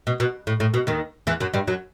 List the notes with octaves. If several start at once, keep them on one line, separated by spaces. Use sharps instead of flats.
B2
B2
A2
A2
B2
D#2 D#3
E2 E3
F#2 F#3
G2 G3
F#2 F#3